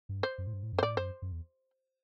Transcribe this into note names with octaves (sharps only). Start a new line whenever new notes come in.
G2
C5
F#2
A2
G2
A2
F#2
C5
A2 D5
F#2 C5
F#2
E2